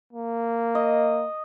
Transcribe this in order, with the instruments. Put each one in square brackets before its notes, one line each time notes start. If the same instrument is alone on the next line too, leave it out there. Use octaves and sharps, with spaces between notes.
[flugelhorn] A#3
[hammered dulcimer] D#5